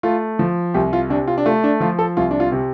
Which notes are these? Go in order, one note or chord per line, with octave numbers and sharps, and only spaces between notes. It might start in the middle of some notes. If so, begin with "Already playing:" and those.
A3 F4
F3
C2 G4
F4
C3 D4
F4
D4
A3 F4
D4
F3 F4
A4
C2 F4
D4
F4
C3